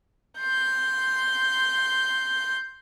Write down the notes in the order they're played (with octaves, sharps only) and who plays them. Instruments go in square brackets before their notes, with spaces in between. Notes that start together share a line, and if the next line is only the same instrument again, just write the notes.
[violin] C6 G6